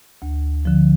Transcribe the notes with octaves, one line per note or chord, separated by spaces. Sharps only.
D2
D3 F3